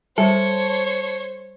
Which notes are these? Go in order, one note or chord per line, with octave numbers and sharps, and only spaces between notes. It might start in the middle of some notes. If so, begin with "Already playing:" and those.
G3 A4 C5 C#5